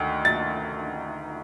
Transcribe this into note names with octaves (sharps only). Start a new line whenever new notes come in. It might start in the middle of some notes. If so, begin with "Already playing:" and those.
Already playing: D2 D#3
A6